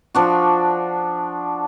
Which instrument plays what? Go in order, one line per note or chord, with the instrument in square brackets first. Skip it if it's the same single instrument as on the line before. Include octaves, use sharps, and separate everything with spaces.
[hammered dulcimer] F3 D4 F#4